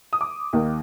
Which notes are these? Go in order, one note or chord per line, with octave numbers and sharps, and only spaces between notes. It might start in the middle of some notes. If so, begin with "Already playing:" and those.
D#6
D6
D#2 D#3 A#3